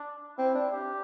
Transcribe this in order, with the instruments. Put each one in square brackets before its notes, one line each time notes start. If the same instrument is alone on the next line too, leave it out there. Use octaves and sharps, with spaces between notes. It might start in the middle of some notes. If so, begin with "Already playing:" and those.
Already playing: [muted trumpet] D4
[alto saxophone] C4 [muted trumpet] E4
[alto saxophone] D4
[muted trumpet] G4